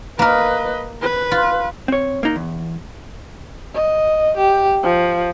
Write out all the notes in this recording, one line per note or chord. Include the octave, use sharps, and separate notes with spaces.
A#3 A#4 B4 D#5
B4
F4
C4 C#5
A#3 D#4
E2
D#5
G4
F3